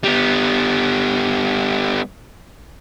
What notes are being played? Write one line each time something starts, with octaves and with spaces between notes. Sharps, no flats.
G3 B3